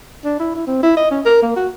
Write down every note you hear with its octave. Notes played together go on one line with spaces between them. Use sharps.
D4
E4
E4
C4
E4
D#5
C#4
A#4
A#3
F#4